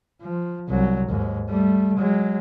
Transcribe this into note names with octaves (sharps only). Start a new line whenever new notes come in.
F3
C2 F#3
D#2 G#2
G3 A3
F#3 G#3